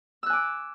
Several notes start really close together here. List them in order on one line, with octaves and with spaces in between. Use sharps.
E6 F#6 G#5 D6